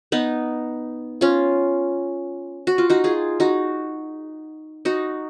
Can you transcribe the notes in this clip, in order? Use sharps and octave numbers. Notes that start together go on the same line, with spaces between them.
B3 D#4
C#4 F4
F#4
F4
D#4 F#4
F4 G#4
D#4 F#4
D#4 F#4